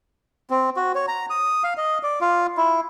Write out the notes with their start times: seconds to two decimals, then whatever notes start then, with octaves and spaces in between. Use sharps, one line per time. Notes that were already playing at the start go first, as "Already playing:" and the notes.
0.50 C4
0.76 F#4
0.95 C#5
1.08 A#5
1.30 D#6
1.64 F5
1.77 D#5
2.03 D5
2.21 F4
2.57 E4